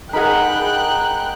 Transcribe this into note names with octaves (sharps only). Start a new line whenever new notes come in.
D#4 G#4 A#4 F#5 G5 B5 F#6